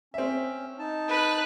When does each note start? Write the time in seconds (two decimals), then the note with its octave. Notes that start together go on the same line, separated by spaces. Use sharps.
0.14 C4 C#4 E5
0.79 D#4 A5
1.09 B4 F#6